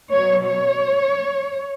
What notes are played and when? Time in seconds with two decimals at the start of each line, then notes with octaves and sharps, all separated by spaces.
0.12 B2 F#3 C#5
0.46 C#5